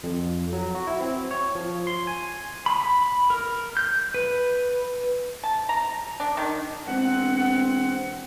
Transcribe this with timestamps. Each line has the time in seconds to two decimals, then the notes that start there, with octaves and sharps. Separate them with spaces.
0.03 F2
0.53 F#3
0.75 F#4
0.87 E4
1.00 C4
1.31 C#5
1.55 F3
1.87 C6
2.07 G#5
2.66 B5
3.30 A#4
3.77 G6
4.14 B4
5.44 A5
5.69 A#5
6.20 D4
6.37 D#3
6.87 E1 C4 F#5